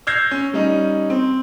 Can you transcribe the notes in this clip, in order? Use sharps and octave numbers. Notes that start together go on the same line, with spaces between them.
E6 F6 G6 G#6 A#6 C7
C#4
G3 C#4 D#4
C4